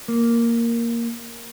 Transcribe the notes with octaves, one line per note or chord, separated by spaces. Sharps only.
A#3